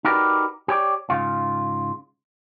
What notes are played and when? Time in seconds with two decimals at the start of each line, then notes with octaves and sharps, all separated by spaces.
0.05 D#4 F#4 G4 A#4 B4 D5
0.68 G4 C#5 D5
1.10 G#2 C#3 F4